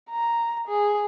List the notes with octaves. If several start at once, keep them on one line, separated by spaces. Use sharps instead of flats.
A#5
G#4